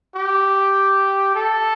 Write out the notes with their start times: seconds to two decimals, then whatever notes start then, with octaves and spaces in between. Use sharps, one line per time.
0.15 G4
1.35 A4